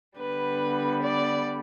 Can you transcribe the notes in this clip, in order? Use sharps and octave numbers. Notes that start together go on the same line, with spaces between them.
D3 G3 B3 B4
D5